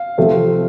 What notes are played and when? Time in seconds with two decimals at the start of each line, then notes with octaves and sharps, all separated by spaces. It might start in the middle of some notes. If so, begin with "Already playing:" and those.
Already playing: F5
0.18 C3 F3 A3 C4